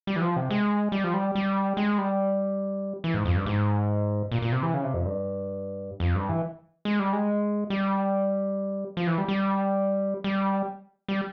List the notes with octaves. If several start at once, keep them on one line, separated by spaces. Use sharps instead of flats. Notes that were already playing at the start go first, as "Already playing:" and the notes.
G3
E3
F3
C3
G#3
G3
F3
G3
G3
G#3
G3
E3
G#2
F2
G2
G#2
A#2
A#2
C3
E3
C#3
C3
F2
G2
F2
G2
E3
G#3
G3
G#3
G3
F3
E3
G3
G3
G3
G3